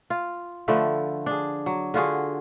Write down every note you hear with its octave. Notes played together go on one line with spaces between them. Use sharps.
F4
D3 F3 A3 B4
D4 G#4
F#3
D3 F4 F#4 G#4